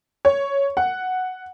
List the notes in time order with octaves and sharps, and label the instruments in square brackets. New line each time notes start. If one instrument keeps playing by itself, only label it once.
[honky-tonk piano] C#5
F#5